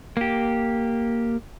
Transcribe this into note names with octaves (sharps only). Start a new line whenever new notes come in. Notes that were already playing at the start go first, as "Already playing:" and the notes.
A#3 G4